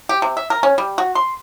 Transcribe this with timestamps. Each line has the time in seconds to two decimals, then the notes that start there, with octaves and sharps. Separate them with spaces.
0.09 G4
0.22 C3
0.37 E5
0.50 A#4
0.63 C#4
0.78 G3
0.98 F#4
1.15 C6